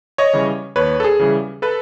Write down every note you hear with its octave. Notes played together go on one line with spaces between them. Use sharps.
C#5 D#5
C#3 E3 G3
D#2 B4 C#5
A4
G#4
C#3 E3 G3
A4 B4